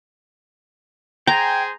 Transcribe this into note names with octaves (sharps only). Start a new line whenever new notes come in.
G#4 C5 G5 G#5 A#5